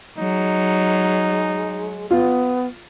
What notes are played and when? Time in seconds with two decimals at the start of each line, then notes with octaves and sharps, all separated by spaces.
0.18 F#3 G#3 D#4
2.11 B3 F4